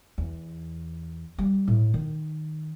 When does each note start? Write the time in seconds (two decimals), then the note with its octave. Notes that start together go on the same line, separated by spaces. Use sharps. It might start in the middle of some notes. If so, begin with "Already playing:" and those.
0.18 E2
1.38 G3
1.68 A2
1.94 D#3